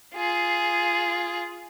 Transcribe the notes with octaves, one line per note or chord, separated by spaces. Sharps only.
F4 G#4